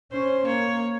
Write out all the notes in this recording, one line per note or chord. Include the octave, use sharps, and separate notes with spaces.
C#4 C5
A#3 C#5